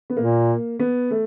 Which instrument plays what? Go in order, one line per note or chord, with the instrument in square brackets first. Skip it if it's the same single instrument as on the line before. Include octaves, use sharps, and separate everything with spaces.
[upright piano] B3
[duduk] A#2 [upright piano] A#3
[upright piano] B3
A3